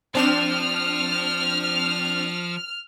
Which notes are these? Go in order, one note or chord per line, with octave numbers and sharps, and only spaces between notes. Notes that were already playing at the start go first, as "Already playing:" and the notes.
F3 C4 D4 F6 E7